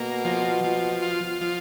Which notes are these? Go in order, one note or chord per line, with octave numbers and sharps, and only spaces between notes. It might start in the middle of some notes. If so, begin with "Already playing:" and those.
Already playing: B2 A#3
F3
F3
F4
F3